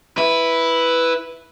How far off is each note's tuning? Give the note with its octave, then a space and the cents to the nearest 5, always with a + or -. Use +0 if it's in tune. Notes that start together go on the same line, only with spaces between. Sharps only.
E4 +0 B4 +0